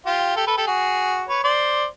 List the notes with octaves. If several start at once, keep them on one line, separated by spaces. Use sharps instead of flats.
F4 G4
G4 A4
A4 B4
G4 A4
F#4 G#4
B4 C#5
C5 D5